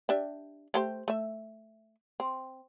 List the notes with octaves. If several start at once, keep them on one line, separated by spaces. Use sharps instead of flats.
D4 G4 E5
A3 G4 C5
A3 E5
C4